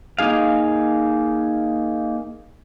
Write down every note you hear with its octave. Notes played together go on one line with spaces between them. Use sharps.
A#3 D#4 G#4 F5